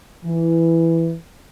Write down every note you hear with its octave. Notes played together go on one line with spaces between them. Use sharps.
E3